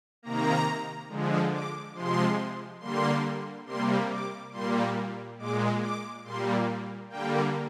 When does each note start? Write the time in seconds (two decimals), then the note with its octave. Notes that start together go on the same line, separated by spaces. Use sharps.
0.23 C3 D#3 A#3 A#5
1.09 D3 F3 G#3
1.52 D6
1.94 C3 F3 G#3 C6
2.80 D3 G3 A#3 C6
3.66 C3 G3 A#3 C6
4.09 D6
4.52 A#2 G3 A#3 C6
5.38 A#2 G#3 D6
5.81 D6
6.24 A#2 G3 A#3 C6
7.10 D3 G3 A#3 G5